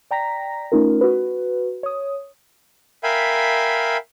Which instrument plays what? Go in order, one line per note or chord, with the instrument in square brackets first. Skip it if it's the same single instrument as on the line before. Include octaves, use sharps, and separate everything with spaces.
[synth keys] D5 G5 A#5 A#6 B6
A3 C#4 D#4 F4 A#4
F#4 B4
C#5 D#6
[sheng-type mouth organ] A#4 E5 F5 G5 G#5 B5